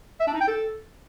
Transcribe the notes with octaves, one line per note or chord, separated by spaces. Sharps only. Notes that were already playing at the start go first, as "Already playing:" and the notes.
E5
D4
D#4
G5
A4